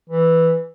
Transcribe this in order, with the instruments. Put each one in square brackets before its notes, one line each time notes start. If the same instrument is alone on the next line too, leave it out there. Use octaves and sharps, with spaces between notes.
[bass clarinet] E3